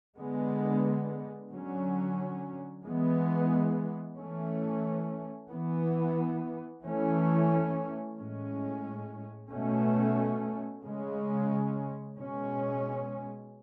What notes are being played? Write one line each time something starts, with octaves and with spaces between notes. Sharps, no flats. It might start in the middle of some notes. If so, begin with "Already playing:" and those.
D3 G#3 B3
D3 F#3 C#4
E3 G#3 B3
E3 A3 C#4
E3 B3
E3 A3 C#4
A2 G#3 C#4
B2 A3 C#4
C#3 G#3 C#4
B2 G#3 C#4